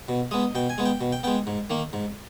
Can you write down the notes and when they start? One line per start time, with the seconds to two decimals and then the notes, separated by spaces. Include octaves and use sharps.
0.09 B2
0.31 G#3 B3 D#5
0.55 B2 G5
0.70 G#5
0.78 G#3 B3
0.85 G5
1.01 B2
1.12 G5
1.23 G#3 B3 G5
1.47 G#2
1.70 D#3 A#3
1.93 G#2